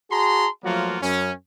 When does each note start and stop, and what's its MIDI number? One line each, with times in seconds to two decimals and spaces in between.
0.11 0.48 66
0.11 0.48 68
0.11 0.48 81
0.11 0.48 82
0.11 0.48 84
0.64 0.97 53
0.64 0.97 54
0.64 0.97 57
0.64 0.97 58
0.64 0.97 65
0.64 0.97 66
1.01 1.32 42
1.01 1.32 61